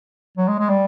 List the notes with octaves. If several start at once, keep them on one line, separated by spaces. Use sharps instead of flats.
F#3
G#3
G#3
G3